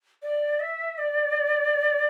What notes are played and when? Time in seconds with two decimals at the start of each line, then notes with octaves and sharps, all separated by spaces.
0.22 D5
0.60 E5
0.98 D5